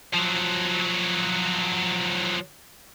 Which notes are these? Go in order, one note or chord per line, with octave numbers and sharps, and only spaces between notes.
F3 F#3